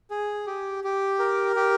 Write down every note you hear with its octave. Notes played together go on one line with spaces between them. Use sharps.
G#4
G4
G4
A#4
G4